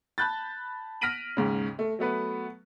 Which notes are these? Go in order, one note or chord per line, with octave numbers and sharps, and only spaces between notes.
A5 B5 F#6 G6 A6
F6 A#6 B6 D7 D#7 F#7
D#2 G#2 C#3
A3
F#3 A3 B3 B4